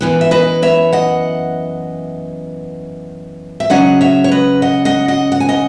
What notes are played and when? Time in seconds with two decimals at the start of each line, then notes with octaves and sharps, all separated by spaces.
0.01 F#2 E3 B3
0.21 E5
0.31 B4 D#5
0.62 C#5 E5
0.93 D#5 F#5
3.60 E5
3.70 C#3 F#3 C#4 D#5 F#5
4.01 C#5 E5
4.24 C#5
4.31 B4 D#5
4.62 D#5 F#5
4.85 D#5 F#5
5.08 D#5 F#5
5.32 F#5
5.40 G#5
5.49 D#5 F#5